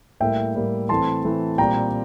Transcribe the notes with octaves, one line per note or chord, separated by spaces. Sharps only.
A2 G3 A#3 E5 G5
A2 G3 A#3
E3 A3 C4 A5 C6
E3 A3 C4
A#2 G3 C4 G5 A#5